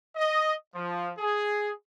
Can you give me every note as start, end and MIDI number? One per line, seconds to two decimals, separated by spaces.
0.16 0.52 75
0.75 1.09 53
1.18 1.71 68